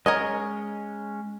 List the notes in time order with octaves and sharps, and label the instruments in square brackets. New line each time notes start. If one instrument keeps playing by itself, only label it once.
[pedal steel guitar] G#3 C#4 [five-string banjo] A#4 C#5 D#5